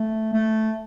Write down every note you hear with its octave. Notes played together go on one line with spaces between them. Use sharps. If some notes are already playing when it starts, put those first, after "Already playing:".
Already playing: A3
A3